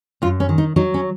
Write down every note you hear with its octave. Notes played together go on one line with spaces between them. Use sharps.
F#2 F4
C#4
D#3
D#4
F#3 D#4
C#4